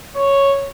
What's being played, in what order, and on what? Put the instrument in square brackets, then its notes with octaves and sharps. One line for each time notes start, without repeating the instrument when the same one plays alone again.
[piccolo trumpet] C#5